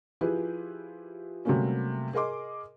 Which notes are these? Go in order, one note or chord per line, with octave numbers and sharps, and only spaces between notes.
F3 E4 F4 G4 G#4 B4
C3 F#3 G3 A3 A#3 C#4
G#4 A#4 D#5 C6 D6